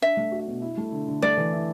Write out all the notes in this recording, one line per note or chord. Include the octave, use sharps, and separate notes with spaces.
D4 E5
A3
F#4
B2
E4
A3
D3
D3
A3 D5
E3
E4